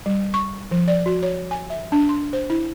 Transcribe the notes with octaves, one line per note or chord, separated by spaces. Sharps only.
G3
C#6
F3
D5
F#4
C#5
G#5
E5
D4
C6
C5
E4